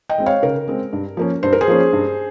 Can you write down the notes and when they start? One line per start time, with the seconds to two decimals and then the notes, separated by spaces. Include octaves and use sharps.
0.09 D#5 G5
0.18 G#3 C4
0.26 C#5 F5
0.43 C#3 A#4
0.68 G#3 C4
0.93 G2
1.17 F3 A#3 C#4
1.43 G2 C5
1.53 A#4
1.61 G#4 C5
1.68 F3 A#3 C#4
1.93 G2